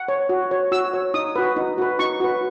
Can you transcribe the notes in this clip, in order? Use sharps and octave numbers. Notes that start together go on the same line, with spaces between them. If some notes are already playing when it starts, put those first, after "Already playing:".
Already playing: F#5
C#5
F#4
C#5
F#4 E6
C#5
D#4 D#6
F#4 B4
D#4
F#4 B4
D#4 C#6
F#4 B4